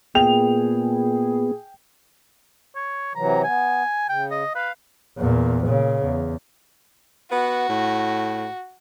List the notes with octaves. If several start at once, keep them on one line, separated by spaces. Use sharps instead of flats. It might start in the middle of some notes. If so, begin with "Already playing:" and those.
A#2 B3 G#4 G5 F7
C#5
C3 E3 F#3 A#5
B3 G#5
C#3 G5
D#5
B4 F5
E2 A#2
A#2 C#3
E2
B3 F#4
A2